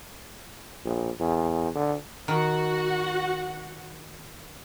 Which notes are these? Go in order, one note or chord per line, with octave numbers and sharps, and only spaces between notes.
A#1
E2
D3
D#3 F#4 F#5